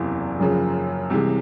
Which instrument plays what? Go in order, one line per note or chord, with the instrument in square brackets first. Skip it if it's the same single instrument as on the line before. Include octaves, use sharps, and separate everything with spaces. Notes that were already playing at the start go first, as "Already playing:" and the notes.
Already playing: [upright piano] F#1 E2 C3 E3
F#1 F#2 C#3 F3
C2 C3 E3 G#3